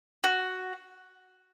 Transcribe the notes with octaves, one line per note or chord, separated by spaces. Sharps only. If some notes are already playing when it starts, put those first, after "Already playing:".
F#4